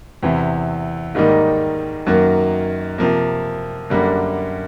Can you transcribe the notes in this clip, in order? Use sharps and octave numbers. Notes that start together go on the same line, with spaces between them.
E2 C3 E3
G#2 D#3 G3 A#3 D#4
F#2 D#3 F#3 A#3
C3 F3 A#3
F#2 D3 G3 A#3